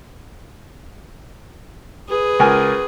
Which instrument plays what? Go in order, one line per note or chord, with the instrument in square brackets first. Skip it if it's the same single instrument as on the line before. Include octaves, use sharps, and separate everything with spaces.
[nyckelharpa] G#4 B4
[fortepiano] C#2 A#4 G#5